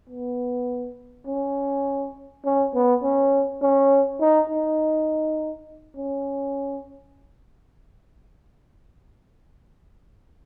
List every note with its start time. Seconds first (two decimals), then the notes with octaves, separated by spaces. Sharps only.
0.10 B3
1.27 C#4
2.45 C#4
2.74 B3
3.04 C#4
3.62 C#4
4.21 D#4
4.50 D#4
5.97 C#4